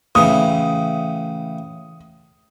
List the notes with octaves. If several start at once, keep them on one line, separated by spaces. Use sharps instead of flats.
A2 C#3 E3 D#6